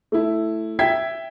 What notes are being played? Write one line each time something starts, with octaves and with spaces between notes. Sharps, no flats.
A3 E4
E5 G5 G#6 B6